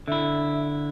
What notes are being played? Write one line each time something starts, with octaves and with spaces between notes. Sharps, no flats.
D3 E4 E5